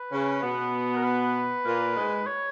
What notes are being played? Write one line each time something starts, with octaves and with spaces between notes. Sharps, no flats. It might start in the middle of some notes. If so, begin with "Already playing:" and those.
Already playing: B4
C#3 C#4
B2 B3
A#4
B4
A#2 A#3
G#2 G#3
C#5